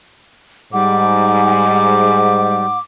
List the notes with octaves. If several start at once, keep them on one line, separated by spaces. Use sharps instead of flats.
G#2 G3 F#5 D6